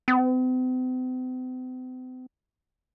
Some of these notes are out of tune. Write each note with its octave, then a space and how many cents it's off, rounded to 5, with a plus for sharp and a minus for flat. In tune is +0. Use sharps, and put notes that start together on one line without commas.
C4 -45